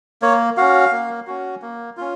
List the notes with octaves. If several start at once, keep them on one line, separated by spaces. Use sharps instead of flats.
A#3 C#5
C#4 F#4 F5
A#3
C#4 F#4
A#3
C#4 F4